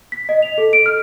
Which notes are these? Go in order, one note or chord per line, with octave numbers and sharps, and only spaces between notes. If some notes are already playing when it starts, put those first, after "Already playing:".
B6
D#5
F7
A4
D7
F6